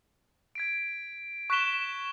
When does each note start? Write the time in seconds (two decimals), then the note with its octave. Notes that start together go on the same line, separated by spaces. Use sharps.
0.55 G#6 B6 D7
1.50 C#6 F#6 B6 E7 G7